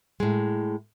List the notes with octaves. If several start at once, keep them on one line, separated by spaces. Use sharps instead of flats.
A2 G#3